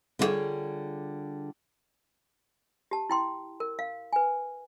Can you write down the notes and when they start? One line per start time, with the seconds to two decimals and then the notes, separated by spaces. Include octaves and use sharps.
0.19 D3 G3 E4 F4 G#4 C#5
2.91 G4 A5
3.10 E4 G5 C6
3.60 A#4
3.79 F5
4.13 B4 G#5